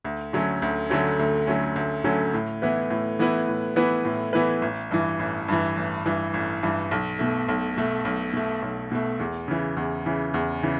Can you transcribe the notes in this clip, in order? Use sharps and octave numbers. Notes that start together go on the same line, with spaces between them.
D2
D3 F#3 A3 C#4
D2
D3 F#3 A3 C#4
D2
D3 F#3 A3 C#4
D2
D3 F#3 A3 C#4
A2
E3 B3 E4 B4
A2
E3 B3 E4 B4
A2
E3 B3 E4 B4
A2
E3 B3 E4 B4
A1
G2 E3
A1
G2 E3
A1
G2 E3
A1
G2 E3
B1
B2 A3
B1
B2 A3
B1
B2 A3
B1
B2 A3
E2
C#3 E3
E2
C#3 E3
E2
C#3 E3